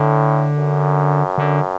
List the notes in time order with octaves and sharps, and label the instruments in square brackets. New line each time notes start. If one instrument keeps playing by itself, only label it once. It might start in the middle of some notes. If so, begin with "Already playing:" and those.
Already playing: [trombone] A2 [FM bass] D3
[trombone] F#2
[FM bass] D3